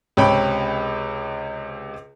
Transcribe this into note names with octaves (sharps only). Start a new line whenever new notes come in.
C#2 C3 C#5 G5 B5